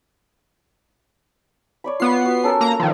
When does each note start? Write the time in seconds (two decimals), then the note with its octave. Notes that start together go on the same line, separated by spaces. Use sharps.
1.84 C#5 D5 B5
2.00 B3 F4 C7
2.25 F#4
2.44 C#4 A4 A#4
2.61 A#3 A#5
2.80 D#3 F3